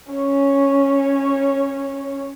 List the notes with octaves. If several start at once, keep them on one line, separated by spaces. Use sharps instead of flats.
C#4 C#5